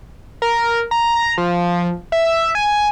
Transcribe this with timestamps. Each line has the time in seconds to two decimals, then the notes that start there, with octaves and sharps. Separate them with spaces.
0.42 A#4
0.91 A#5
1.38 F3
2.12 E5
2.55 G#5